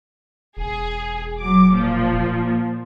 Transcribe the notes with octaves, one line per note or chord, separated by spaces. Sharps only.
E1 G#4
F#3 D6
A#2 F3